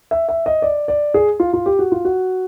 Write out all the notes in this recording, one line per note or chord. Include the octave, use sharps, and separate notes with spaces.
E5
E5
D#5
D5
D5
G#4
F4
F4
G4
F#4
F4
F#4